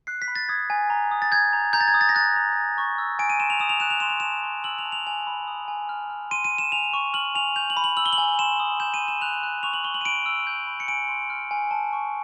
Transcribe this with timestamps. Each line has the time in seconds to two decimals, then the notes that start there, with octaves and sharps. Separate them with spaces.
0.07 F#6 C7
0.22 B6
0.28 B5
0.35 A6
0.49 D#6 G#6
0.70 G#5
0.90 A#5
1.11 D#6
1.22 A6
1.32 G6 G#6
1.53 A#5
1.73 A#5 G6
1.81 A6
1.88 G#6
1.94 D#6
2.01 A6
2.09 A#6
2.15 F#6 A6
2.36 A#5
2.57 G#5
2.78 C#6
2.98 E6
3.19 G#5 D7
3.30 D#7
3.40 C6 E7
3.50 F7
3.60 D#6 E7
3.69 F7
3.80 F#6 E7
3.90 F7
4.00 C6 E7
4.10 F7
4.20 A5 E7
4.44 C6
4.64 E6 F#7
4.78 F7
4.85 A5
4.92 F7
5.07 G#5 F7
5.27 B5
5.47 D#6
5.68 G#5
5.89 F6
6.10 F6
6.31 C6 D#7
6.44 D#7
6.52 C6
6.58 E7
6.72 G#5 F7
6.93 C#6
7.14 F6 F#7
7.35 G#5 F7
7.56 G6 F7
7.70 F#7
7.77 B5
7.84 F#7
7.97 E6 F#7
8.06 G7
8.13 F#7
8.18 G#5
8.39 C6 E7
8.60 D#6
8.80 G6 E7
8.94 D#7
9.01 C6
9.08 E7
9.21 F#6 F7
9.43 F#6
9.63 C#6 F7
9.73 F#7
9.84 C#6 G7
9.94 F#7
10.01 D#7
10.05 B5 D7
10.26 E6
10.47 G6
10.67 B5
10.80 C#7
10.88 G#5 D7
11.08 C6
11.30 F6
11.51 G#5
11.71 A5
11.93 C#6